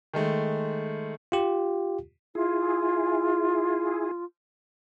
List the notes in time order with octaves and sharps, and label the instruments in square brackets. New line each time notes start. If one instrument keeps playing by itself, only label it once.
[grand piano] D#3 G#3 A3
[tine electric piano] F4 G4
[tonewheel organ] E4 G#4 [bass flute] F4